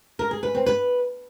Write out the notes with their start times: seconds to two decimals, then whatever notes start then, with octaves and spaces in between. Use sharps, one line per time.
0.19 A#4
0.31 G#4
0.43 B4
0.55 C4
0.66 B4